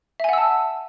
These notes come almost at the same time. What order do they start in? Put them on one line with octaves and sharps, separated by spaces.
E5 G#5 F#5 E6 A5